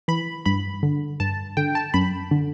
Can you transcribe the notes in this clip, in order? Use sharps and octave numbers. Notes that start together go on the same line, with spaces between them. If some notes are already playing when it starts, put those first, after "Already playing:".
E3 B5
G2 B5
D3
G2 A5
D3 G5
A5
F#2 B5
D3